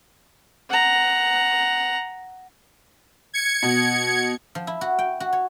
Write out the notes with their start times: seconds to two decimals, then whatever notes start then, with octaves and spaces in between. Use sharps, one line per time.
0.70 F#5 A#5
3.33 G#6 C#7
3.63 B2
4.55 F3
4.67 E4
4.81 F#4
4.99 G5
5.20 F#4
5.33 C#5